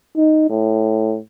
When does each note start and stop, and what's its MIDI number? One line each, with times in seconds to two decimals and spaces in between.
0.17 0.47 63
0.50 1.18 45